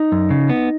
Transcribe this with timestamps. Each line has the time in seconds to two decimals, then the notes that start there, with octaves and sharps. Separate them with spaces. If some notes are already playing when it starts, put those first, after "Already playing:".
Already playing: D#4
0.12 F#2
0.30 C#3
0.49 B3